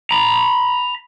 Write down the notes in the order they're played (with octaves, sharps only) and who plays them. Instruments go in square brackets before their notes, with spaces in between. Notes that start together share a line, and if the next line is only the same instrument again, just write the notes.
[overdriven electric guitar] A#5 B5